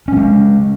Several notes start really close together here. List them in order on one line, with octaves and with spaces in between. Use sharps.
C#4 G3 G#3